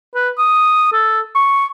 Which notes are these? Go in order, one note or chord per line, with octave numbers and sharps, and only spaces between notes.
B4
D#6
A4
C#6